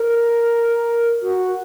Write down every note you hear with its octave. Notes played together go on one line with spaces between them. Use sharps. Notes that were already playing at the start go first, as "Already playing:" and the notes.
Already playing: A#4
F#4